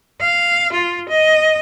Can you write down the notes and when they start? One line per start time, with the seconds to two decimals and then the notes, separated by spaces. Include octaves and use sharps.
0.21 F5
0.73 F4
1.09 D#5